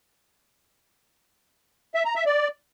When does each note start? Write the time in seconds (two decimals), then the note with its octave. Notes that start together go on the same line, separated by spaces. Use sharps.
1.95 E5
2.05 A#5
2.16 E5
2.26 D5